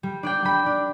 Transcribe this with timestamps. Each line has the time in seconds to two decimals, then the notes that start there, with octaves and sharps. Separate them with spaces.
0.03 G3
0.23 D4 D5 G5
0.45 G3 G5 B5
0.66 D4